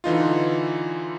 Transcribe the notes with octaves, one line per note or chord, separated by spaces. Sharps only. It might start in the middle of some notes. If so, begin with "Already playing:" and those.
D3 E3 D#4 F4